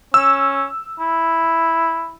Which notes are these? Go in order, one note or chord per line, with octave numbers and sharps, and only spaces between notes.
C#4 E6
E4